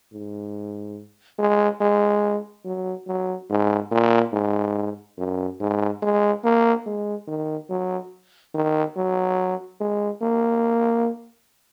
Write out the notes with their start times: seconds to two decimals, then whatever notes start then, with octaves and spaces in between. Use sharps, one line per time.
0.13 G#2
1.39 G#3
1.81 G#3
2.65 F#3
3.07 F#3
3.50 G#2
3.91 A#2
4.33 G#2
5.18 F#2
5.60 G#2
6.02 G#3
6.44 A#3
6.86 G#3
7.27 D#3
7.70 F#3
8.54 D#3
8.96 F#3
9.80 G#3
10.22 A#3